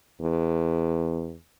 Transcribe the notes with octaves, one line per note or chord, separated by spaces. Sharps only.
E2